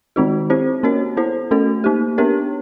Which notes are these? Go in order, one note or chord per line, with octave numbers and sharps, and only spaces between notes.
D#3 G#3 C4 D#4 F#4
C4 E4 G4 C5
A#3 C#4 F#4 A#4 C#5
B3 E4 A4 C5
A3 C#4 F#4 A4
A#3 D#4 G4
B3 D4 G4 A#4 C#5